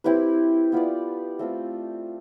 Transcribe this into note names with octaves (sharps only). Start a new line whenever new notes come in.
C4 E4 G4 B4
B3 F4 B4 D5
A3 C4 F4